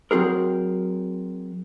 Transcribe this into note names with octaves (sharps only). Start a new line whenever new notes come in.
F#3 C4 F#4 G#4 A#4